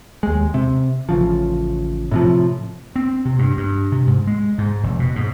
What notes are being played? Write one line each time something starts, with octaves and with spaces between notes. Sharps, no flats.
D#2 G#3
C3
A1 C#3 F3
A2 C3 F3
C4
C3
G2
G2
C3
G#2
G#3
G#2
F1
B2
G#2